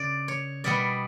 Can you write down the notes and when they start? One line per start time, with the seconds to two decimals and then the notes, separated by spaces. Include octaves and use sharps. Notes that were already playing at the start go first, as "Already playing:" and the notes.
Already playing: C#3 D5
0.28 C#5
0.64 B2 G3 B3 D5